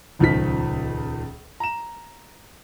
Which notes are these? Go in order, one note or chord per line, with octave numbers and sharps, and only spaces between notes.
D#1 C#2 D#3 F3 B6
A#5 E7